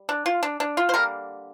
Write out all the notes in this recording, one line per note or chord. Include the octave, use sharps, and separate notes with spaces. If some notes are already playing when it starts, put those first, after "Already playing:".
Already playing: G3
D4
F4
D4
D4
F4
C5
D3 G3 A#3 A#4